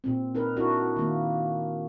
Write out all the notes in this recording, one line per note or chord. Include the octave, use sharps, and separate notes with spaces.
A#2 C4
D#4 A#4 B4
D4 E4 F#4 A#4
D#3 A#3